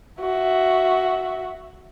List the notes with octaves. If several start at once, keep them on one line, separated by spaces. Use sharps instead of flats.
F#4 E5